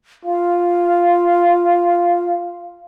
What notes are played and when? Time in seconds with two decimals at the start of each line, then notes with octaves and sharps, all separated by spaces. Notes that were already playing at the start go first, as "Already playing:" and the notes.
0.25 F4 F5